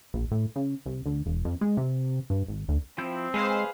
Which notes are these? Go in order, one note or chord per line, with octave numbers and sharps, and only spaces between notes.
A#1
A2
C#3
C2
D2
E1
F2
G#3
C3
G2
G#1
D2
F3 C4 E4 G6
G#3 G#4 B4 C5 F5